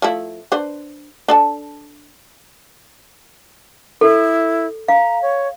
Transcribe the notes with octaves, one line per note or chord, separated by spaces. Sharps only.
F3 A3 E4
D4 B4 C5
D4 A4 A5
E4 A4
F5 A#5
C#5